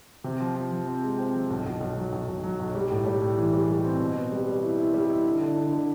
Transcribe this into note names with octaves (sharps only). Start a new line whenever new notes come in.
C3
F3
F3
F3
C4
G#3
C4
F3
B1
B1
B1
F#3
B1
B1
F#3
B1
G3
A2
G3
A2
E3
G3
G3
C4
B2
B3
G3
G3
E4
E4
G3
E4
D3
D3
D3
D3